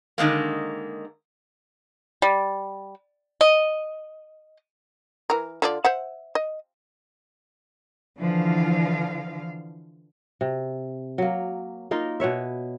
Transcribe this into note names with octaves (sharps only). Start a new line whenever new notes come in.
D3 D#3 G#3 A#3
G3
D#5
E3 A#4
D3 F4 D5
C5 E5 F#5
D#5
D3 E3 F3 F5
C3
F#3 A#3
A#3 D#4 F4 A#4
B2 B4 C#5 E5